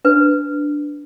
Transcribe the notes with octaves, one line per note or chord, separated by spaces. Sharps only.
D4 B4